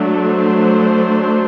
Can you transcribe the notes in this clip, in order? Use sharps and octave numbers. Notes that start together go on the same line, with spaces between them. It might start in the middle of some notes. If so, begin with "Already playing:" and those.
Already playing: F#3 A3 D4
C5